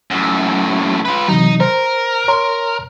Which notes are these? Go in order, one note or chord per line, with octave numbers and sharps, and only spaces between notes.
F#2 A2
F4 B4
C3 E3 F#3 D#4
A#4 C5
C#5 A#5 C6